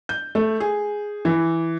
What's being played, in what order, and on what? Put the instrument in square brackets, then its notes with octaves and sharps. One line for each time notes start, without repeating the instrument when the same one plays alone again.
[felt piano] G6
A3
G#4
E3